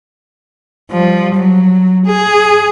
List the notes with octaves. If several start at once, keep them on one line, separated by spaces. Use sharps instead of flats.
F3 G3
F#3
G#4